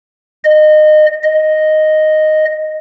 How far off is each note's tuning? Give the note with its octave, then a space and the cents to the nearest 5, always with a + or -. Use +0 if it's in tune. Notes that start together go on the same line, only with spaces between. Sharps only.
D#5 -25
D#5 -5